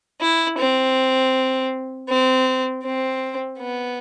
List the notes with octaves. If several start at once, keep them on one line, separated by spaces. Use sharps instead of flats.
E4
C4
C4
C4
B3